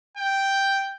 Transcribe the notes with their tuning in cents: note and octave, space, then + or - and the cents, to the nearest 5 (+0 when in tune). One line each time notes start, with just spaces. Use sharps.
G5 +0